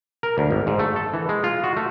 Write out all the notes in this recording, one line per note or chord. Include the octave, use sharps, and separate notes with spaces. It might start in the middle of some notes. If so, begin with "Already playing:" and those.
A#4
D2
G#1
G#2
A3
A4
E3
G#3
F4
F#4
A3